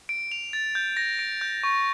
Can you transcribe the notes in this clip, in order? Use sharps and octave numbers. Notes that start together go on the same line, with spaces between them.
D7
F7
A6
G6
A#6
D7
G6
C#6